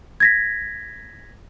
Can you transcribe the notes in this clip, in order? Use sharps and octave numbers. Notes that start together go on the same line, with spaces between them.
G#6 A#6 B6